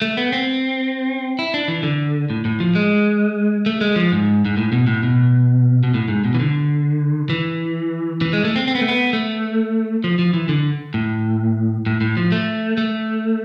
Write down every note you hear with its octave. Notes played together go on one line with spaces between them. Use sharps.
A3
B3
C4
E4
D4
E3
D3
A2
A2
F3
G#3
A3
G#3
F3
G#2
G#2
A2
B2
A2
B2
B2
A2
G#2
B2
E3
D3
E3
E3
G#3
A3
C4
C4
B3
A3
B3
A3
F3
F3
E3
D3
A2
A2
A2
F3
A3
A3